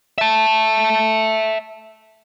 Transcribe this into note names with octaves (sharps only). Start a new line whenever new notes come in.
E5 A5